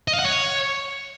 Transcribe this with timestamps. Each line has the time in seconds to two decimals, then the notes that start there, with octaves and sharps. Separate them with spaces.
0.08 D#5
0.13 F5
0.19 F#5
0.25 C#5